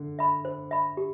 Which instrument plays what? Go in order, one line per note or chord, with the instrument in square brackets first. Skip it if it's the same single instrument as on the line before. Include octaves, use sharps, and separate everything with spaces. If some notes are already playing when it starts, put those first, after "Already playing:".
Already playing: [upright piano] D3
[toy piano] E5 B5
C5
E5 B5
G4